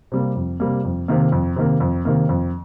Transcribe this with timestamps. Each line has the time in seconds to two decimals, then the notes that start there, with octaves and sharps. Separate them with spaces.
0.12 C3 G3 A#3
0.36 F2
0.60 C3 G3 A#3
0.84 F2
1.08 C3 D#3 A#3
1.32 F2
1.56 C3 D#3 A#3
1.80 F2
2.05 C3 D#3 A#3
2.29 F2